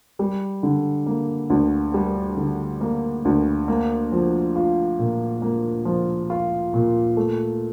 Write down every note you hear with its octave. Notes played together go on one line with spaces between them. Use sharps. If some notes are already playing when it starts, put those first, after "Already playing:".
G3
D3
A#3
D2
G3
D3
A#3
D2
A#3
F3
F4
A#2
A#3
F3
F4
A#2
A3